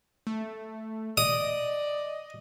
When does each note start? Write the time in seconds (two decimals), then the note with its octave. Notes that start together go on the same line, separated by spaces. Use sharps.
0.27 A3
1.18 D5 D#5 D#6